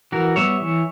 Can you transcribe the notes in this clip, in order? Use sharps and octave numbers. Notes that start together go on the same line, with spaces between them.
E3 F#4 A#4
G3 B3 C#5 E5
E3